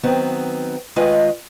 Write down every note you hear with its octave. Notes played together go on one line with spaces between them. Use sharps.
D#3 F#3 B3 C4
D#3 G#3 C#4 F4 B4 D#5